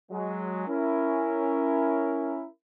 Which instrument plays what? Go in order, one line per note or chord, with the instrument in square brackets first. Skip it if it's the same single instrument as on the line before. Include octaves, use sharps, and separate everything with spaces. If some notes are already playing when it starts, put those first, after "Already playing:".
[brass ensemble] F#3 G#3
C#4 E4 A#4